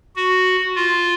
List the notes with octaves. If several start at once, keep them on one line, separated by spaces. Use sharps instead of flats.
F#4
F4